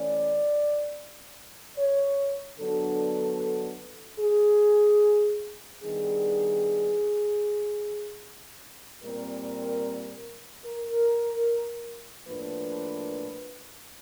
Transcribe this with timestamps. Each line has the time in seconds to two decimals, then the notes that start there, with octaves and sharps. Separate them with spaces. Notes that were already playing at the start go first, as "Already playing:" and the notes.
Already playing: E3 A3 C#4 D5
1.77 C#5
2.58 D3 F#3 B3 D4 A4
4.19 G#4
5.81 D#3 G3 B3 D4 G#4
9.04 A#2 G3 C4 A#4
10.65 A#4
12.27 A2 F3 A#3 D4 B4